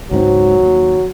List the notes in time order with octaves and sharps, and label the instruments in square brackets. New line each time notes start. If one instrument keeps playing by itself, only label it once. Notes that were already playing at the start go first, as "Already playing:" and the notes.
[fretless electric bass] C#2 G#2 C4 [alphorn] F#3
[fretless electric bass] D#2